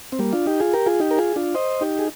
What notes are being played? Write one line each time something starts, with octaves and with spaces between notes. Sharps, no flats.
C4
G3 A#3
D4 F4
D#4 G4
F4 G#4
G4 A#4
F4 G#4
D#4 G4
A#4
F4 G#4
D4 F4
C5 D#5
D#4 G4
G#4